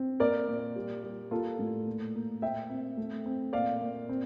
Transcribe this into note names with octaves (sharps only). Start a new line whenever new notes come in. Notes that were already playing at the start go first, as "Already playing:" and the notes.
Already playing: C4
A#3 A#4 D5
A#2
G3
G3
A#3 F4 A4
A2
A#2
A#3
A#2 E5 G5
C4
A3
C4
A#2 D5 F5
A#2
C4